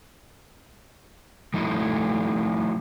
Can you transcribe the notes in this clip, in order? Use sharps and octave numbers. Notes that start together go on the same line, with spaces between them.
F3 A3 D#4 E4